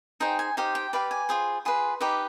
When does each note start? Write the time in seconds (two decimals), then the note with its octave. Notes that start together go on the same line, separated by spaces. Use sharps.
0.20 D#4 G#4 C5 G5
0.39 G#5
0.57 D#4 G4 C5 F5
0.75 G5
0.93 G4 B4 D5 F5
1.11 G#5
1.29 F4 G#4 C5
1.65 F4 G#4 B4 C6
2.00 D#4 G4 B4 D6